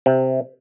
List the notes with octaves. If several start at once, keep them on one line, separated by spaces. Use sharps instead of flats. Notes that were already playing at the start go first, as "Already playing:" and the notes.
C3